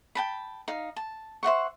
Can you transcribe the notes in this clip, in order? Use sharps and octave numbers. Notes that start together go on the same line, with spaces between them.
G5 A5 B5
D#4 F5
A5
C5 E5 F#5 C#6